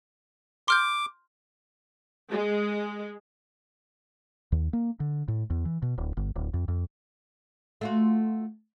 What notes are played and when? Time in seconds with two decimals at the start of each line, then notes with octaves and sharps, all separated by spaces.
0.68 C6 D6 F6 G6
2.30 G#3
4.52 D#2
4.73 A#3
5.00 D3
5.28 A2
5.50 E2
5.65 E3
5.82 B2
5.98 D1
6.17 G1
6.36 D1
6.54 F2
6.68 F2
7.81 A3 F4 F#4